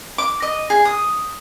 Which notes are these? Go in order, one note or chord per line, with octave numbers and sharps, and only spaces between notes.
D6
D#5
G#4
D#6